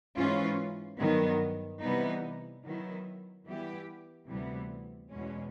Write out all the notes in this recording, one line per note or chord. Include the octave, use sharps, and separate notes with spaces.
G#2 E3 G#3 C#4 F4
G2 D#3 F#3 B3
C3 E3 G3 B3 D#4
D#3 F#3 B3 E4
E3 G3 B3 E4 G4
D2 C3 E3 G3 B3
E2 B2 G#3 C#4